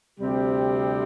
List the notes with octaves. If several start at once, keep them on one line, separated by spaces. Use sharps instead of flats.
D2 C3 G3 C4 G4